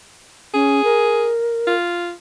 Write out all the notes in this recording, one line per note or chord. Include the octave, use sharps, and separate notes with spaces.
C#4 G#4
A#4
F4